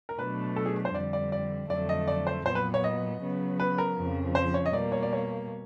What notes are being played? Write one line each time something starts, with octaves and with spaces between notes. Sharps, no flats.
A#4
B2 F#3 A3 D4 B4
A4
G#4
C5
F2 D3 G3 D5
D5
D5
F2 D3 F#3 A3 D5
D#5
D5
C5
A#2 F#3 B3 C5
B4
C#5
D#5
C#3 F#3 B3
B4
A#4
F2 C#3 F3
C5
C#5
D#5
B2 G3 A#3 D5
C#5
D5
C#5